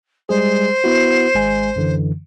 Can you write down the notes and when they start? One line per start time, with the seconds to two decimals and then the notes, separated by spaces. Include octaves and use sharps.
0.29 G3 G#3 G#4 C5
0.84 B3 E4 F#4
1.35 G#1 G#3 G#5
1.76 F#2 D3 E3